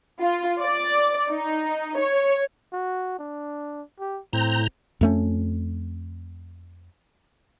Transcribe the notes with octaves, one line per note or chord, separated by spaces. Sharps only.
F4
D5
D#4
C#5
F#4
D4
G4
A2 C4 A#5 G6
F2 A3 C#4